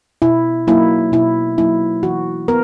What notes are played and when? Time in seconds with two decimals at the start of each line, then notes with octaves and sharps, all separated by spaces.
0.22 B2 E4
0.67 F#3 A#3 D#4 E4
1.12 B2 E4
1.58 F#3 A#3 D#4 E4
2.03 E3 F#4
2.48 B3 A#4